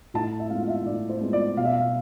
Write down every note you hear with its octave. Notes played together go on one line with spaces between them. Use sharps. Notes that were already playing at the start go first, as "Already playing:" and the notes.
A2 A5
E5
G#3 B3 F4 F5
F5
E5
A2 D5
C5
G#3 B3 F4
D5
B2 F5
E5
F5